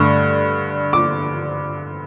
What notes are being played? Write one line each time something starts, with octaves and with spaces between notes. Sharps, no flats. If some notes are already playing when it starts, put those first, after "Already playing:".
Already playing: G2 D3 A3 C#6
D6